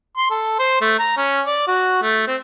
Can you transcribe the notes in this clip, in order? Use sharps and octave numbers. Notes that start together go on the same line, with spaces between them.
C6
A4
C5
A3
A#5
C#4
D5
F#4
A3
C4